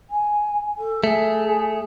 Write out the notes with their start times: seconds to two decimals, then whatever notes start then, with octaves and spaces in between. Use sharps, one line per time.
0.10 G#5
0.78 A4
1.04 A3 G#4